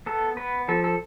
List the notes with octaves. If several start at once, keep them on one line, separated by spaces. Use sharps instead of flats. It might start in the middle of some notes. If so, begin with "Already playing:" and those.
B3 A4
B3 B4
F3 A4
A4